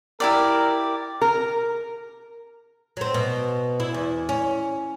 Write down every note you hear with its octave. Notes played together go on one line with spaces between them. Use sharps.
E4 G4 A#4 D5
A#4
F#3 C4
B2
E4
E2
C#4